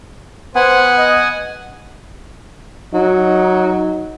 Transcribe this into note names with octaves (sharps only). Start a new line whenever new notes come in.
B3 C5 F#5 G#5
D#5
F#3 D#4